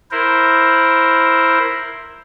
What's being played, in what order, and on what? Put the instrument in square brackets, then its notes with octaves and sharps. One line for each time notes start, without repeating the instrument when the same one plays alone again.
[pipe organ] E4 A#4 C5